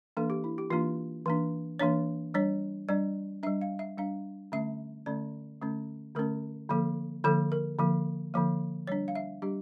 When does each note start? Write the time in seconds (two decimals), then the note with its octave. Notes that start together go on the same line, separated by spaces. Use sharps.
0.17 E3 A#3 D4 A4
0.30 G4
0.44 E4
0.58 G4
0.71 E3 A#3 D4 F4
1.26 E3 A#3 D4
1.79 E3 A#3 D4 C#5
2.34 G3 D4 C#5
2.89 G3 D4 D5
3.43 D4 E5
3.46 G3
3.61 F5
3.79 E5
3.98 G3 D4 F5
4.52 D3 A3 C#4 E5
5.06 D3 A3 C#4 D5
5.62 D3 A3 C#4
6.15 D3 A3 C#4 A#4
6.70 D3 F3 A#3 A4
7.24 D3 F3 A#3 A4
7.52 A#4
7.79 D3 F3 A#3
8.34 D3 F3 A#3
8.87 G3 D4 C#5
9.08 F5
9.15 E5
9.42 G3 D4 G4